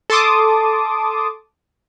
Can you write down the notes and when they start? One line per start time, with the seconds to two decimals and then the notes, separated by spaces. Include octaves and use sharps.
0.10 A4 A5 C6 D6 D#6